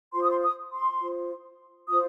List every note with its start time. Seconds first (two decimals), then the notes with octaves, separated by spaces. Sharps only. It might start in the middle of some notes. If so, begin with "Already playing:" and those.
0.13 F4 C5 C6
0.22 D#6
0.30 C6
0.43 D#6
0.72 C6
1.01 F4 C5
1.88 F4 C5 D#6